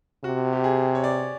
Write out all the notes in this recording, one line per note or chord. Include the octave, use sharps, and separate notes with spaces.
C3 F#4
G4
G#4
C#5
D5